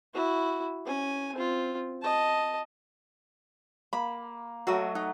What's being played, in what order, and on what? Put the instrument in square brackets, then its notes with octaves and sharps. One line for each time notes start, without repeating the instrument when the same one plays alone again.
[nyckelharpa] E4 F#4
C#4 G#5
C4 F4
D#5 A5
[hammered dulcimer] A#3 [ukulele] B5
[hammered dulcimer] F#3 A3 [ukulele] F#4 D#5
[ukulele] D#4 [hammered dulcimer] F#5